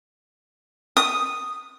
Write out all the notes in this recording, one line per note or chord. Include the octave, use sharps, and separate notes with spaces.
D#6